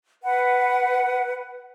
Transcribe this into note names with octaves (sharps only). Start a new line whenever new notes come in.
B4 F#5